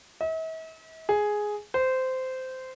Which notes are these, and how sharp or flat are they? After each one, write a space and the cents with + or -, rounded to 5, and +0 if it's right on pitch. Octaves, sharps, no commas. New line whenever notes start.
E5 -45
G#4 +5
C5 -15